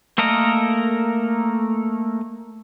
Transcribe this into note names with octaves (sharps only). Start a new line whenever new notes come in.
A3 A#3 A4 A#4 D#5